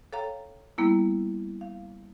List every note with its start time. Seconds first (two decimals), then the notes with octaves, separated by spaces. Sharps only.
0.13 A4 C#5 F5 G5 A#5
0.78 G3 A#3 B3 E4
1.61 F5